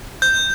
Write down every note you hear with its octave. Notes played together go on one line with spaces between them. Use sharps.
G6